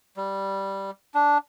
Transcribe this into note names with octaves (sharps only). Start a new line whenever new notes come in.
G3
D4